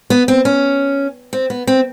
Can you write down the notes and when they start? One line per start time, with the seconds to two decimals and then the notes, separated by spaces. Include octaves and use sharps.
0.10 B3
0.28 C4
0.45 C#4
1.33 C4
1.50 B3
1.67 C4